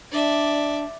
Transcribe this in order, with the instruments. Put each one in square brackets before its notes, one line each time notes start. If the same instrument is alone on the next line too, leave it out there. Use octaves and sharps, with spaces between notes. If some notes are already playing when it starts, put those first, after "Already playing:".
[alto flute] D4 [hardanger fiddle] D5 E5